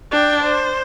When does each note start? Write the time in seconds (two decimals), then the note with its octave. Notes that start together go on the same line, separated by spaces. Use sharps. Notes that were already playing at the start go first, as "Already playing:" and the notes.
0.11 D4 G5
0.43 C5